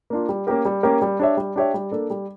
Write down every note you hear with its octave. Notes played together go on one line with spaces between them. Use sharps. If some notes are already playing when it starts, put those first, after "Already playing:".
A#3 D4 F4
G3
A#3 C#4 G4 A#4
G3
A#3 C#4 G4 A#4
G3
D4 G4 C#5 E5
G3
D4 G4 C#5 E5
G3
A#3 D4 A4
G3